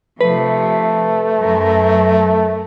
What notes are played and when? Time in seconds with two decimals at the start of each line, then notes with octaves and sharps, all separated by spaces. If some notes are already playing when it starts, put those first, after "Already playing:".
0.21 C3 F3 A3 B4
1.39 F#2 A#4